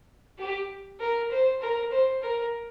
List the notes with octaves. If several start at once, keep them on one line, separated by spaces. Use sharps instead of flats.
G4
A#4
C5
A#4
C5
A#4